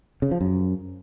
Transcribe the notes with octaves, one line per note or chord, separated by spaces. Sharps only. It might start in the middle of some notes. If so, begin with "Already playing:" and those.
C#3
F3
F#2